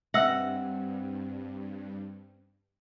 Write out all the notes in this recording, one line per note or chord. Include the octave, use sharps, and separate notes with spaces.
G2 C4 B4 D#5 E5 F#5 E6